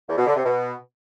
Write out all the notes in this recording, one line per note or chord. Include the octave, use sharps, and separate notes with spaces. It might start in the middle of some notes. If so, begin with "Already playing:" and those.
E2
B2
D3
C3
B2